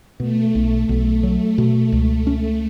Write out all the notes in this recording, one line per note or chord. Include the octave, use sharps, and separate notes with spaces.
B2 A3
B1
B1 A3
F#3
B2
C#2
C#4